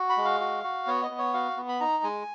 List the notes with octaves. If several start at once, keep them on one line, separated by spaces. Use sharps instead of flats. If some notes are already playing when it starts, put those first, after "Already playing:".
Already playing: F#4
B5
G#3
F5
F#4
F#4
B3 C#5
D#5
B3
C#5
F#4 F5
B3
B5
D#4 A#5
G#3 G#5